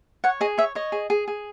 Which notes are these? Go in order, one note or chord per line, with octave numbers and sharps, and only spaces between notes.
C#5 F#5
G#4 D#5
C#5 E5
C#5 D#5
G#4
G#4
G#4